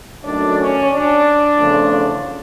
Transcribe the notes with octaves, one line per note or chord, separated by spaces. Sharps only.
F#2 D#3 F#3 A3 D4 D5
C#4 C#5
D4 D5
E2 C#3 F3 A3